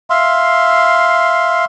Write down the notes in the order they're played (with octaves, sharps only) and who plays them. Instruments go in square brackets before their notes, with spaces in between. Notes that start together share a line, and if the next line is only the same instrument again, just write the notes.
[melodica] E5 F5 C6